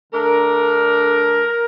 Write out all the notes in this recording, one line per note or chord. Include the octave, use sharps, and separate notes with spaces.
D3 A3 D4 A#4